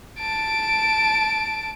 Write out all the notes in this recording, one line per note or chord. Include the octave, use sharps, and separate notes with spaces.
A5 D7